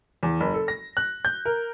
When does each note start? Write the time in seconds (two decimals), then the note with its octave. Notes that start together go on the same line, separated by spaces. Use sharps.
0.23 E2
0.40 F#1
0.54 A4
0.68 A#6
0.97 F#6
1.25 G6
1.45 A#4